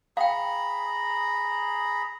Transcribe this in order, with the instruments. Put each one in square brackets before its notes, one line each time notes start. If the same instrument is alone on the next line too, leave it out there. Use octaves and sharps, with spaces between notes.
[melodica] G#4 A#5 B5 [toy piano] F5 G5